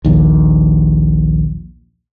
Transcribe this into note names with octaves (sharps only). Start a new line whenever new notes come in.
A#1 D#2